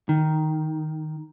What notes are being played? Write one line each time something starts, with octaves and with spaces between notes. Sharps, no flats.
D#3